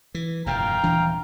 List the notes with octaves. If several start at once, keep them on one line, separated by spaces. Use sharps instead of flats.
E3
F1 G2 A#2 F5 G5 A#5
D#1 E3 D4